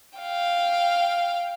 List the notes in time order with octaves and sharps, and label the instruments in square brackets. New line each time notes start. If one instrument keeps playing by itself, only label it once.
[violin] F5 G5